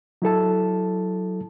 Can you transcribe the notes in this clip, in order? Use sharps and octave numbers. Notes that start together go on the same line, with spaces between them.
F#3 E4 A4 A5